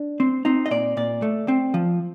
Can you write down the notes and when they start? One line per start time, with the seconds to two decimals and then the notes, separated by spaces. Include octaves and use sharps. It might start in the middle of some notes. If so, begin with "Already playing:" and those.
Already playing: D4
0.20 C4
0.45 C4 D#4
0.66 D#5
0.71 A#2 D5
0.97 A#2 D5
1.22 A3
1.48 C4
1.74 F3